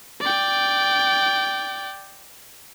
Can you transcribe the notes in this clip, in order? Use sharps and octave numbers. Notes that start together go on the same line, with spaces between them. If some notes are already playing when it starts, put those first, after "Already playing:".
D5 G5